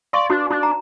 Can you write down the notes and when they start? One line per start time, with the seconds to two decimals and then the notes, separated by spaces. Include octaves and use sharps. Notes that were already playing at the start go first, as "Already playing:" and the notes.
0.13 D5 F5 C6 C#6
0.30 D4 F#4 B4
0.50 D4 D#4
0.63 A#5